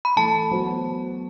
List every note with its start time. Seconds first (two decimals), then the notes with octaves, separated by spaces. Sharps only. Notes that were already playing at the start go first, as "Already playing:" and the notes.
0.05 B5
0.16 E3 A3 E4 A4 A5
0.51 F#3 B3 F#4 C5